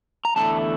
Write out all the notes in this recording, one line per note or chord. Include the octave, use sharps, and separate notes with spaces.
A#5
E2 D3 A3 E4 A5